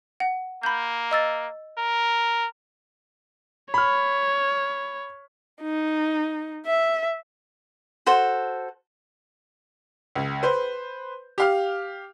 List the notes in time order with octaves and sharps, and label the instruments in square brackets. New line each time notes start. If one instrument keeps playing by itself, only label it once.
[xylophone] F#5
[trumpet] A#3 [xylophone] B5 G6
[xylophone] D#5 E6 A6
[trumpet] A#4
[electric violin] C#5 [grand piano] B5 F6
[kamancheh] D#4
E5
[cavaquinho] F#4 A4 C5
[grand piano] C#2
B4 C5
G4 F5 F6